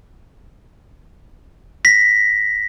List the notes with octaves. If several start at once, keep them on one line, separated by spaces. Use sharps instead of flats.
A#6 B6